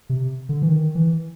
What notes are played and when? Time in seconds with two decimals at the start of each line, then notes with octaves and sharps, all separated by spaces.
0.09 C3
0.49 D3
0.62 E3
0.69 D#3
0.95 E3